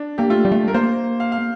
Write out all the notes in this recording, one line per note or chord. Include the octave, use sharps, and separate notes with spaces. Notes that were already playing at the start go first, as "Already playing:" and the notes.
Already playing: D4
A#3 G4
A3 F4
G3
A3
A#4
A#3 C5
F5
F5